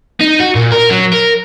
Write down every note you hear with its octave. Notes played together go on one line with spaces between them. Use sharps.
D#4
F#4
A#2
A#4
F#3
A#4